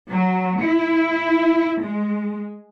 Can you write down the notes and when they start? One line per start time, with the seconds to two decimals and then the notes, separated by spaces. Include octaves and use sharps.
0.11 F#3
0.61 E4
1.82 G#3